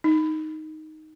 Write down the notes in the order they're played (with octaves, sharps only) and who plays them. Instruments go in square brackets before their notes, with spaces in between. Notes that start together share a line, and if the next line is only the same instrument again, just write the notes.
[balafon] D#4